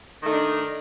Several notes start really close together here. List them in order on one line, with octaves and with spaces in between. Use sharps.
D#3 A3 D#4 D4